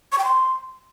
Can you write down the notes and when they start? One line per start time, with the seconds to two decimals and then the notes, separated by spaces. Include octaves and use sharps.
0.12 C#6
0.18 G5
0.24 C6